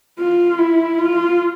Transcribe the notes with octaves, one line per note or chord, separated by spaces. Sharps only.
F4
E4
F4